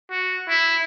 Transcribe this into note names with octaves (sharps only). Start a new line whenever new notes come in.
F#4
E4